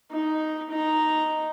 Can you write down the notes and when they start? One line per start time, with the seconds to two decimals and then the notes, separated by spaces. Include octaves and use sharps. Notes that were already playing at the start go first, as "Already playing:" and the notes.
0.11 D#4
0.71 D#4 A#5